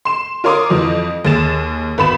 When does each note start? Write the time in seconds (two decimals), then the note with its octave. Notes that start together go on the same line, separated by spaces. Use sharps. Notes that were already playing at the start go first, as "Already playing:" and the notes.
0.05 C6 E7
0.44 F4 A#4 C#5 C6 D6 D#6
0.70 F2 E3 F3
1.25 D#2 G#4 A6 E7
1.98 G#1 B3 B5 E7